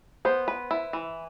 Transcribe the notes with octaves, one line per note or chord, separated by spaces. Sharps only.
B3 C5
B4
E4
E3